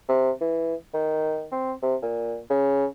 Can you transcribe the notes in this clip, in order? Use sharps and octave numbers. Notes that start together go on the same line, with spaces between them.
C3
E3
D#3
C4
C3
A#2
C#3